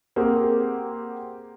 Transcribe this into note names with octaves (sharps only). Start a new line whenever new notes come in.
A#3 C4 G4 G#4 F#5